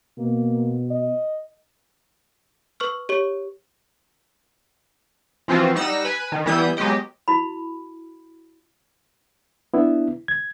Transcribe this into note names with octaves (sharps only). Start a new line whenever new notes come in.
B2 A#3
D#5
B4 C#6 F6
G4 C#5 C#6
E3 F3 C4 F4 F#4
G3 D#4 F#5 E6 A#6
B4 G#5
D#3
E3 G3 B3 E4 D#6 G6
F#3 G#3 B3 G4 D#5
E4 F#4 B5
B3 D4 E4
G#6